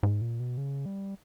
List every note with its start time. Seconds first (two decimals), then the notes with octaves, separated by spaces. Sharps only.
0.03 G#2
0.21 A#2
0.40 B2
0.57 C#3
0.86 G3